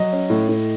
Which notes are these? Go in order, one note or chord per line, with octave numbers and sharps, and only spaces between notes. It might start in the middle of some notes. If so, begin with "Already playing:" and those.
Already playing: F#3 D#5
C#4
A2
A2